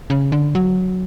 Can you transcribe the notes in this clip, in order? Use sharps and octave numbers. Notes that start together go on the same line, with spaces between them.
C#3
D3
F#3